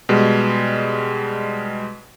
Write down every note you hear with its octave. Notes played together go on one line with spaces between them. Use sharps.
B2 G3 G#3